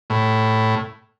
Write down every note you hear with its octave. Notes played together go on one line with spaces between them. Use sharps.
A2